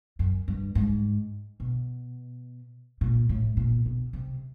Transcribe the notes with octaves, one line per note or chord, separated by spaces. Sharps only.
F#2
G2
G#2
B2
A#2
A2
A#2
B2
C3